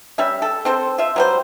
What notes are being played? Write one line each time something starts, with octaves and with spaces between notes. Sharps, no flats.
G3 C#4 E5
A4
C4 A4 C5
F4 E5
F#3 G3 C5